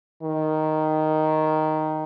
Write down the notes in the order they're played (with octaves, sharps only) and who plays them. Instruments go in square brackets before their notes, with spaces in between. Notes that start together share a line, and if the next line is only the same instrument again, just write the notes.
[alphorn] D#3